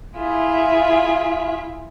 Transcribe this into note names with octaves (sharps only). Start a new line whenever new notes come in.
E4 F4 G#4 E5